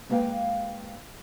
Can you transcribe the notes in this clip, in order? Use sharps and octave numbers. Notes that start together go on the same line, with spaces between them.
G#3 A#3 B3 B4 F5 G5